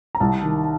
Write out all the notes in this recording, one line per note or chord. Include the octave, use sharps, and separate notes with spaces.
A#5
C2 A5
D#3